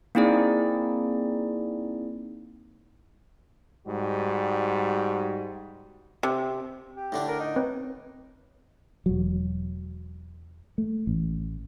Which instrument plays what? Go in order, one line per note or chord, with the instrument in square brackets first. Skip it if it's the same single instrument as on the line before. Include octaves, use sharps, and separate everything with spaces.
[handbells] A#3 C4 D#4 E4 G#4 D5
[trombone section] G#2 G3 F#4
[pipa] C3
[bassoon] G4
[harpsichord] A2 D3 D4
[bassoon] A#4
D#4
[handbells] C4 B4 C#5
[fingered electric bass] E1 F#3
A3
A1